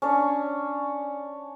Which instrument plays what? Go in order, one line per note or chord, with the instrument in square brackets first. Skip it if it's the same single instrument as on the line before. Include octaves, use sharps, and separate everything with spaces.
[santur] C#4 D4 C#5